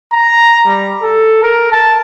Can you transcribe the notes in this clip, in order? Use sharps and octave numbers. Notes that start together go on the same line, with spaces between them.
A#5
G3
A4
A#4
A5